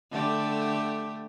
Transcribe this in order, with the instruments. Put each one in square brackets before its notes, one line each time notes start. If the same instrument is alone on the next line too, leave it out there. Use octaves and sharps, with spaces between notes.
[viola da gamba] D3 A3 G4